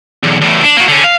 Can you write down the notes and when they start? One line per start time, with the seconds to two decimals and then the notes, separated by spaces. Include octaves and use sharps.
0.23 B1 E2
0.41 E2 A2
0.62 D4
0.77 A#3 F#4
0.88 D3 C#4
1.04 F5